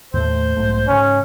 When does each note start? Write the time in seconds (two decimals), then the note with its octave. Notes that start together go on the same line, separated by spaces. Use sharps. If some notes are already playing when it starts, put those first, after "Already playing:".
0.13 D#2 A2 A3 C5
0.57 B1 G#2 A3
0.88 G#2 C#3 C#4